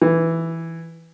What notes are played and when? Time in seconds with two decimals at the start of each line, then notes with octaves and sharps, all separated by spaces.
0.02 E3